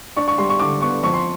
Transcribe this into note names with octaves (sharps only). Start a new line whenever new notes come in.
D4 C#6
C#6
G3 C6
C#6
D3 D6
B3 C#6
F2 C#6
C6